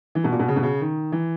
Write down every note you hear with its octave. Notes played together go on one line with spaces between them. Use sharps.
E3
B2
A#2
B2
C#3
B2
C#3
D#3
E3